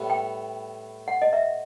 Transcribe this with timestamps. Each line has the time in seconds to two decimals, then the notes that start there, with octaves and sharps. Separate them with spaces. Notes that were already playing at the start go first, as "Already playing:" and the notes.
Already playing: A2 G3 B3
0.10 G5
1.08 F#5
1.22 D#5
1.33 E5